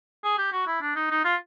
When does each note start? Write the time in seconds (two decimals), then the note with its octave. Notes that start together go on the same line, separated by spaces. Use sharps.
0.24 G#4
0.38 G4
0.53 F#4
0.67 E4
0.82 D4
0.96 D#4
1.11 D#4
1.25 F4